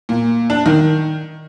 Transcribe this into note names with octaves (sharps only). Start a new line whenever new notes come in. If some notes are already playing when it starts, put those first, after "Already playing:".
A#2
D4
D#3